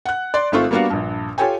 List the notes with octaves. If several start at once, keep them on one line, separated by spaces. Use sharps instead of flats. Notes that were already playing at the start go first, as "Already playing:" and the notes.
F#5 F#6
D5 C6
G#1 A3 C4 F4 C#6
G3 A#3 B3 D4 F#4 F5
A#1 G2
F4 G4 A4 C#5 G5 G#5